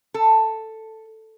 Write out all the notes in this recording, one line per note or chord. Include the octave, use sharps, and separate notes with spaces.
A4